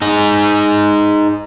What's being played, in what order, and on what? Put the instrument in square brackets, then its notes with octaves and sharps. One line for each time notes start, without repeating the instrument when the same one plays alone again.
[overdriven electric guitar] D#4 G#4